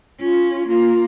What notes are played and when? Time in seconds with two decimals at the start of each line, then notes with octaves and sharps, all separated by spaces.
0.20 C#4 F4
0.67 A#3 F4